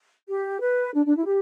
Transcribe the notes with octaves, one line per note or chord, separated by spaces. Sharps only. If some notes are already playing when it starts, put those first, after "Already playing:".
G4
B4
D4
D4
E4
G4